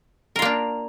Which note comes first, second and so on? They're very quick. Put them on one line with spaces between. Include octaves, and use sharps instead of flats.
A#4 F4 A#3 D4